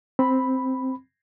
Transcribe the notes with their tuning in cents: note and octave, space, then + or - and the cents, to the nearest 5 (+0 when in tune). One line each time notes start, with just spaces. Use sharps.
C4 +0 B5 +0